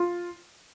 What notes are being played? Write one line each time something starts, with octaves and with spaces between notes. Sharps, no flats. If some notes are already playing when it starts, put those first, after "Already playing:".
Already playing: F4